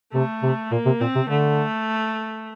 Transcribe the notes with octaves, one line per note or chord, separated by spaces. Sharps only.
C3 A3
C3
A#2 A#3
C3
A#2 C4
C3
D3 A3